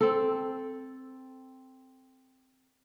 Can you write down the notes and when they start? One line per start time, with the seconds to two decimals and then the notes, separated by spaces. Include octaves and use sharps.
0.01 C4 A4